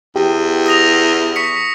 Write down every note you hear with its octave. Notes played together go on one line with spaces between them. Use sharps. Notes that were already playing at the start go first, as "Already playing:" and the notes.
E2 G4
D#6 A#6 F7
C#6 B6 C#7